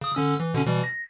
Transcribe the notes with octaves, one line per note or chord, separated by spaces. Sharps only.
C#3 D#6
D3 C#4 E6
E3
B2 D3 C#4
B2 E3 G3
A#6